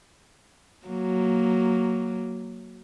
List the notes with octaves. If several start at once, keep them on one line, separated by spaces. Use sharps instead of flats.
F#3 A#3